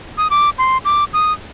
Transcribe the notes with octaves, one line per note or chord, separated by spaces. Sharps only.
D#6
D6
C6
D6
D#6